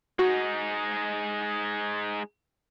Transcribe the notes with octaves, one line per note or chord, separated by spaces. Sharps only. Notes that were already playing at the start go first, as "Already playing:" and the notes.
G#3 D#4 F#4